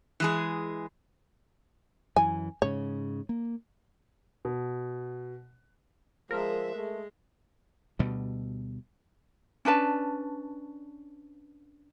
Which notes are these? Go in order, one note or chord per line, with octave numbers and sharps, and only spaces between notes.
E3 G#3 G#4
F#2 E3 G#5
G#2 C#3 C#5
A#3
B2
F3 G#3 A#4 E5
G#3 A3
D2 B2 G3
C#4 D4 B4 A5